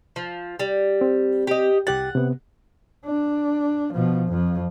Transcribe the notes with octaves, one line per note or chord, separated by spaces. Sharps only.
F3
G3
C4
G4 D#5
C2 G4 F#5 A6
C3 B3
D4
B2 F3
F2 F3